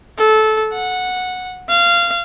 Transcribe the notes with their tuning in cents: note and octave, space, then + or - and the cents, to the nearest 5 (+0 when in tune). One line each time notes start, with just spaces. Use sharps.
A4 -20
F#5 -10
F5 -20